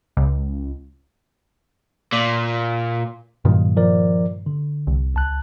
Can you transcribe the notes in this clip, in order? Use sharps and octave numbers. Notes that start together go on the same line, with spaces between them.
C#2
A#2
G2 A#2 D#3 F#3
F3 A#4 D5
D3
C2
C#2 A5 F#6